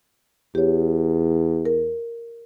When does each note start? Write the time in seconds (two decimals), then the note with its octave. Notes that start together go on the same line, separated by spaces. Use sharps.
0.55 E2 G4 C#5
1.65 A#4